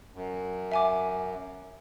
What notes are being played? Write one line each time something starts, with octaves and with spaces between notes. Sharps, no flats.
F#2
E5 G#5 D6